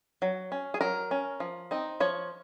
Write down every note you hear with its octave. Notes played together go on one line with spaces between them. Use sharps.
F#3
C#4
G#4
F#3 A#4
C#4
F3
C4 D#4
F3 C#5